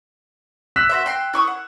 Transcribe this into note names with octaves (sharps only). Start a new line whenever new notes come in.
E6 F#6 B6
F#4 C5 E5
G5 C6
E4 C#6 D#6
F#5